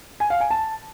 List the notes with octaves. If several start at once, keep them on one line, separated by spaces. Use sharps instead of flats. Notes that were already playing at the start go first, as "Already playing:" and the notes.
G#5
F5
G#5
A5